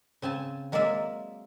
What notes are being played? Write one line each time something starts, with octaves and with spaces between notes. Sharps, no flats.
C#3 C4 G#5 A5
F#3 G#3 A#3 D5 E5 F5